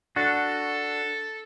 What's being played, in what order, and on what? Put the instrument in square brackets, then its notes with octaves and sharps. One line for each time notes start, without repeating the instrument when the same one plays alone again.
[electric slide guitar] D4 F#4 [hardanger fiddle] A4